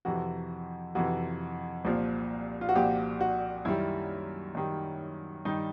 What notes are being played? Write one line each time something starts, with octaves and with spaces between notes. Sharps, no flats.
F2 C3 E3 F#4
F2 C3 E3 F#4
C2 A#2 F3
F4
F#4
C2 A#2 F3 G4
F#4
F#2 D#3 G3 E4
F#2 D#3 G3
G2 D#3 G3 D#4